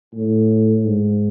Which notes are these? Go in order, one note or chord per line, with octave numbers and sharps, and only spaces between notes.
A2
G#2